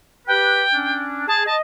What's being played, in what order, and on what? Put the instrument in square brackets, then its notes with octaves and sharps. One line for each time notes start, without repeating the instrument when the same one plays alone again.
[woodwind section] G4 B4 [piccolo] G5
[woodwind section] C#4 D4
[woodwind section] G#4 [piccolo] A5
[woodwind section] D#5 [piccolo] A5